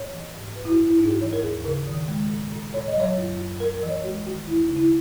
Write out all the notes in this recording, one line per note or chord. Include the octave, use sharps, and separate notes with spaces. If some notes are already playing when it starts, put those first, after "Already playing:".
Already playing: A#2 C#5
E3
G#2
F#2 B4
E4
F#4
F#2
E4
G#2 D#4
G#4
F#4
E3 C#5
A#4
D#2 G#4
C#3 A#4
D#3
G#3
A#2
A#2
A#2 C#5
D#5
F#3 C#5
F#2
F#2
F#2 A#4
A#4
E3
C#5
G#3 F#4
D#3 F#4
D#2 E4
D#4
C#3
E4